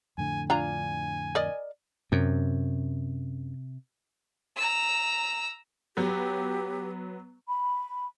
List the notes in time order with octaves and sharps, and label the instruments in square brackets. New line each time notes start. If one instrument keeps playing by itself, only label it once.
[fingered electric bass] F2 A2 D3 [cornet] G#5
[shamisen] D4 F4 A#5 [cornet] G#5
[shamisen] A#4 D5 D#5
[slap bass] F#2 [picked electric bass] C3
[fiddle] A#5 E6
[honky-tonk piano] F#3 B3 [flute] G4
[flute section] B5